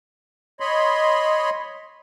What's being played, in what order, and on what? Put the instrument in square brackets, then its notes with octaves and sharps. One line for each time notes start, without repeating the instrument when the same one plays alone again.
[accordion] C#5 D#5 B5 C6